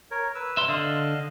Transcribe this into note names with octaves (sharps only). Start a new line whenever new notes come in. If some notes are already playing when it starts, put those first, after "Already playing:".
A#4 C#5
B4 E6
E5 C6
D3 D#5 F5